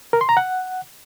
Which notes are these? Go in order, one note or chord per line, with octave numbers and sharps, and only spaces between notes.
A#4
C6
A#5
F#5